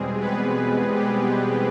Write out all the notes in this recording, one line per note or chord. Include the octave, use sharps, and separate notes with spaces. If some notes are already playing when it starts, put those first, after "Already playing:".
Already playing: E2 B2 G3 G#3 C4 G#4
B3 B4
G3 G4